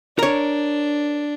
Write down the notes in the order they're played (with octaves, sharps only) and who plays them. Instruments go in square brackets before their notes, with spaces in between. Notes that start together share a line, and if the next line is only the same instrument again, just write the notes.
[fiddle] D4 [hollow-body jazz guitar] A#4 C#5